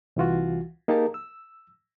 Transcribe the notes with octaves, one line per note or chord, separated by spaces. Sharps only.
C2 E3 F4 F#4
A#3 D#4 G4 G#4 A#4 A5
E6